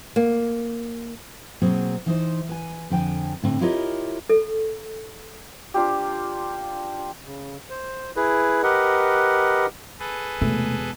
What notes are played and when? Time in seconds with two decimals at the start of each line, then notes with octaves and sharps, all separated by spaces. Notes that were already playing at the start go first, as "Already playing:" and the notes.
0.16 A#3
1.62 B2 F#3 A#3 C4 G#4
2.06 E3 D#4 C5
2.49 B4 G#5
2.90 F2 D3 G5 G#5
3.43 A2 D3 C4
3.61 E4 F4 G4 A#4 C#5 D#5
4.30 A4
5.74 D4 F4 G4
7.25 C#3
7.70 C5
8.16 E4 G#4 B4
8.63 G4 A#4 B4 D#5 F#5
9.99 G#4 A4 B4
10.41 E1 C3 A3